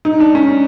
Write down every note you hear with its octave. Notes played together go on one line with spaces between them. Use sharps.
D#4
D4
C#4